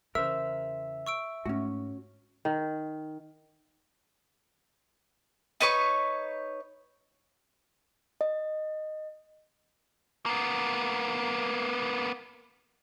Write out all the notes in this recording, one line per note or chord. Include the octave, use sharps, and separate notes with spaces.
E2 C#3 A#4 C5 E5 E6
C#6 E6 D7
G#2 A3 C#4 F#4
D#3
D#4 B4 C#5 C#6
D#5
A#3 B3